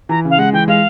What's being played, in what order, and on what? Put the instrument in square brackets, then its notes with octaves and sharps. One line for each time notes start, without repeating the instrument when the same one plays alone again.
[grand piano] E3 [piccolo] A#5
[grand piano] C#3 [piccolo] F5
[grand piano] G#3 [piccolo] F#5
[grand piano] E3 [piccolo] G5
[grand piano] G#3 [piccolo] F5